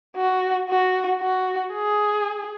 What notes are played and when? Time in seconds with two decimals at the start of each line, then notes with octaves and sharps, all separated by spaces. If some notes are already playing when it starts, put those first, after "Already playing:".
0.16 F#4
0.69 F#4
1.21 F#4
1.74 G#4